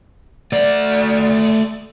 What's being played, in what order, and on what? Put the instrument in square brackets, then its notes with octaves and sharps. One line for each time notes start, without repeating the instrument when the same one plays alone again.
[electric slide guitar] A3 D5